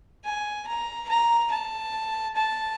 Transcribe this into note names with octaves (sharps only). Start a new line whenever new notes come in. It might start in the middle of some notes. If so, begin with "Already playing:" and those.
G#5
A#5
A#5
A5
A5